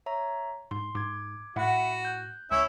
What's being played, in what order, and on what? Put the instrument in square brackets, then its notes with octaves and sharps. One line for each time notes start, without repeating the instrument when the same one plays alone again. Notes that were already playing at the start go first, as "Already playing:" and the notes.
[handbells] C#5 E5 A#5
[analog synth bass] G#2 [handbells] C6
[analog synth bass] G#2 [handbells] D6 G#6
[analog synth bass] A2 [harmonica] F#4 [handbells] E5 F#5 B5
[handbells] F#6 G6
[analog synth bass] C#2 [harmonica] C#4 E4 E5